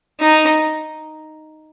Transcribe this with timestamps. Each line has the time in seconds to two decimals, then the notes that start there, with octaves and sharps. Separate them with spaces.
0.20 D#4